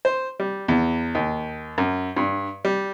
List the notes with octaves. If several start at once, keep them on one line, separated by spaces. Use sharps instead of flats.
C5
G3
E2
D#2
F#2
G2
G3